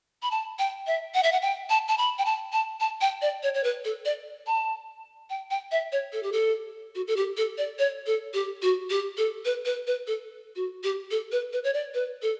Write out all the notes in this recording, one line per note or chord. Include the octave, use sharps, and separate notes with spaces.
B5
A5
G5
E5
F#5
E5
F#5
G5
A5
A5
B5
G5
A5
A5
A5
G5
D5
C#5
C#5
B4
A4
D5
A5
G5
G5
E5
C#5
A4
G4
A4
F#4
A4
G4
A4
D5
C#5
A4
G4
F#4
G4
A4
B4
B4
B4
A4
F#4
G4
A4
B4
B4
C#5
D5
B4
A4